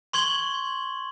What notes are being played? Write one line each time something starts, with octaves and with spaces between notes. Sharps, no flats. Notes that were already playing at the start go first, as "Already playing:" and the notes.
C6 C#6 G#6 F#7 G7